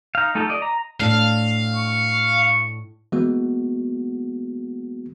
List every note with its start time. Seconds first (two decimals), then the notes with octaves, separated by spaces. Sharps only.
0.15 D#4 F5
0.35 A3 D#4 F4 G4 A4
0.49 D5 D#5
0.62 A#5
1.00 A2 D4 F5
1.76 C#6
3.12 E3 G#3 A#3 B3 F#4